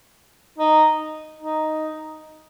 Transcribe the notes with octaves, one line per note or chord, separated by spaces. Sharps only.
D#4
D#4